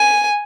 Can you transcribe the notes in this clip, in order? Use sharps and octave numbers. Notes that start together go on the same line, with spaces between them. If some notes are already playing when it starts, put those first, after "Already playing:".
Already playing: G#5